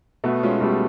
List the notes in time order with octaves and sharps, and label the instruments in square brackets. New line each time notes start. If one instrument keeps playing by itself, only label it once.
[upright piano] B2 [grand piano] A3 B3
[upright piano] G#3 C#4 F4
[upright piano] B2 [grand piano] G3 A3